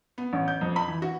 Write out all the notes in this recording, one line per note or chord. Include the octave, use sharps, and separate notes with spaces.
B3
A1
G6
F2
B5
E3
F#4